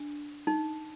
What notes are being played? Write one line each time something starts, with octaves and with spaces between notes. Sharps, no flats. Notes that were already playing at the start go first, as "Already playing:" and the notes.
Already playing: D4
D#4